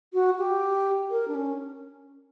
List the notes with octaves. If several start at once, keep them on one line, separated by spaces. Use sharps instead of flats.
F#4
G4
A#4
D4
C#4